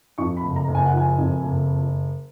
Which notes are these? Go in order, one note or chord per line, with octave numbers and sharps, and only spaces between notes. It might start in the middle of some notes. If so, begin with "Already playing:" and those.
F2 C#6
B5
F#1
A#5
F#1
G#5
F#5
F3 G#5
F2
F#1